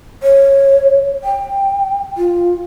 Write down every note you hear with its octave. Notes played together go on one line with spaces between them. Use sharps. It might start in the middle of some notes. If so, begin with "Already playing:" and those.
C#5
G5
F4